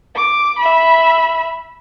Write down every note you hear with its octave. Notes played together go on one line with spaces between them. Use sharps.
D6
E5 B5